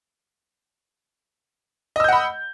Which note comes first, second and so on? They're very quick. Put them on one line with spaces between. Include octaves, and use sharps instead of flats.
D#5 E6 G6 F#5 B5